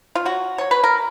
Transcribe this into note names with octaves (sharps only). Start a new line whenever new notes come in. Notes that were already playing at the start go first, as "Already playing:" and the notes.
F4
F#3 F#4
F#3 C#5
B4
A#4